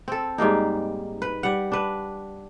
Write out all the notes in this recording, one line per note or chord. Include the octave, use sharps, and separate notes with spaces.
C4 A4
G#2 G3 A#3 D#4
B4
G3 F#5
D4 B4